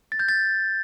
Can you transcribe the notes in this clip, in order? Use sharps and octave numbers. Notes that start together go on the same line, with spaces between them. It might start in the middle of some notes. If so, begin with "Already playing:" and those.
A6
G6
A6